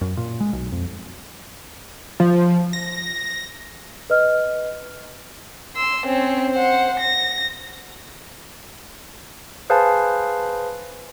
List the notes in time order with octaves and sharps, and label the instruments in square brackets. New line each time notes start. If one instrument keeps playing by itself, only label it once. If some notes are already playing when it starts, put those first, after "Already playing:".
[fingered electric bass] F#2
A#2
G#3
B1
F2
[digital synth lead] F3
A#6
[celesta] B4 D#5 F6
[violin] C6 E6
C4 C#4
C5 F#5
A#6
[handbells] G#4 B4 C5 F5 G#5 A5